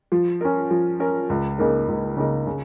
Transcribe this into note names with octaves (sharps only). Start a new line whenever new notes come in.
F3
C#4 A#4
F3
C#4 A#4
C#2
C#3 A#3 D#4 A#4
C#2
C#3 A#3 D#4 A#4
C#3